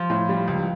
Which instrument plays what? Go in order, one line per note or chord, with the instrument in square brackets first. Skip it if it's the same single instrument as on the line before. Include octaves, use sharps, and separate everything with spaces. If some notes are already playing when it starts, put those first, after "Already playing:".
Already playing: [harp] F3
[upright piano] A2
G3
C#2